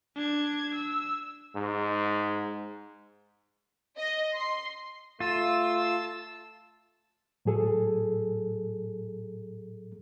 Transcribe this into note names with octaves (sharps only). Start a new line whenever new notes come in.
D4 G#6
E6
G#2
D#5
C6
A3 F4 A5 E6
A2 F#3 G#4 A4